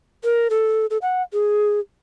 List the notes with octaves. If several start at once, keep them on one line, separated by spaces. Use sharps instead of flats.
A#4
A4
A4
F#5
G#4